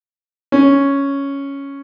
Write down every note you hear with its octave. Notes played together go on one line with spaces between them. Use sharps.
C#4